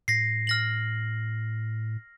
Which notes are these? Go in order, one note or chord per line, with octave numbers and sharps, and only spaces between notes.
A2 A#6 C7
F6 A#6 F#7